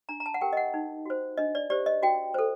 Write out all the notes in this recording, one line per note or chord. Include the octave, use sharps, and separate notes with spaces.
D4 A#5
A#5
A5
F#5
G4 A#4 G5
D#5
F#5
D#4
F#4 C5
D4 D#5
D5
G4 C5 D5
D#5
F#4 G5
A4 C5